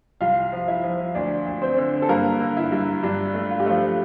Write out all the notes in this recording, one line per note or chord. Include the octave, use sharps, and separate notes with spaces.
C2 F4 F5
F3
E4 E5
F3
D2 D4 D5
D2
C4 C5
D3
A4
G2 A#3 A#4
D3
E4
G2
G2 D4
A3
F4
G4
F3 A3 F4